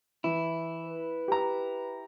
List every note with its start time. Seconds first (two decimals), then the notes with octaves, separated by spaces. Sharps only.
0.24 E3 E4
0.87 B4
1.28 G4 A#5